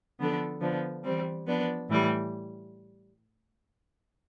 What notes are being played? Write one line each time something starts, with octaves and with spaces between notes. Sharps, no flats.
D3 F3 B3 D4 A4
D3 F3 B3 D4
E3 G3 C4
F3 B3 D4
A2 E3 G3